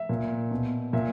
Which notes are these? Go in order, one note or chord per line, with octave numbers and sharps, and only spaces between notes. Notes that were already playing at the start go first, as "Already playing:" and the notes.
Already playing: E5
A#2
B2
A#2 E5